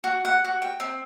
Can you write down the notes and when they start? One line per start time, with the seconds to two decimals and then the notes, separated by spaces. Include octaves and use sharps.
0.04 F#4
0.25 F#5
0.44 F#4
0.62 G5
0.80 C4